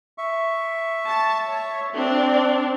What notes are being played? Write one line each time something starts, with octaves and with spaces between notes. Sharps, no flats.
E5 C#6
A5
C#5
C4 D4